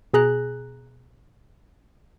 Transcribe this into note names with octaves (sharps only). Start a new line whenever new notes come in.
B2 G#4 A#5 F#6